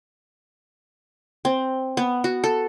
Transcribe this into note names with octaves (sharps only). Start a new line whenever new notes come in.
C4
B3
F#4
A4